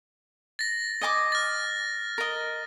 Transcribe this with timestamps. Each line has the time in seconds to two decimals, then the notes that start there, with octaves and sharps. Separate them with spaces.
0.59 A6 A#6
1.01 D#5 G#5 D6
1.32 F6 A6
2.18 A#4 D#5